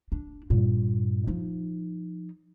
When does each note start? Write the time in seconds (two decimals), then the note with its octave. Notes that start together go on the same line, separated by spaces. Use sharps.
0.12 D4
0.50 G2 A#2
1.27 F3 D#4